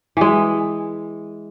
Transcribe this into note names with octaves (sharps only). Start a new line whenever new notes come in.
E3 G#3